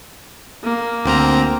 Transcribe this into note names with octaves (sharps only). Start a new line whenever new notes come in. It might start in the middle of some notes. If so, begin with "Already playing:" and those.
A#3
D2 C4 A#5